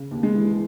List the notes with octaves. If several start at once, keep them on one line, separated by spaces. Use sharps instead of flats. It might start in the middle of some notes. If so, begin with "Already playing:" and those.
Already playing: C#3
D#2
G#3
E3